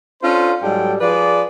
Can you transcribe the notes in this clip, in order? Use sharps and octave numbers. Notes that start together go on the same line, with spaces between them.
C#4 D4 F4 A4 C5
G#2 F#3 G3 A4 G5
F3 G#4 B4 D5